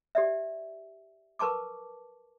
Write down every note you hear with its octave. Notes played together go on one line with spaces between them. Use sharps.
G4 D5 E5
A#4 B4 A5 C#6 D6